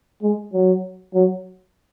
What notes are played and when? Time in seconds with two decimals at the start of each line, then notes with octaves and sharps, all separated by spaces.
0.22 G#3
0.53 F#3
1.14 F#3